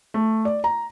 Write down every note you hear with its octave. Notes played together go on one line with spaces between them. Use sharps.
A3
D5
A#5